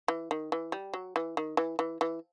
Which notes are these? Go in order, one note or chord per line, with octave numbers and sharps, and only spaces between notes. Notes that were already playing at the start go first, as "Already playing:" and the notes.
E3
D#3
E3
G3
F#3
E3
D#3
E3
E3
E3